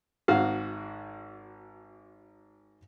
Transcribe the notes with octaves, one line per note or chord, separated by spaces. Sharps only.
G#1 G#2 F#4 F5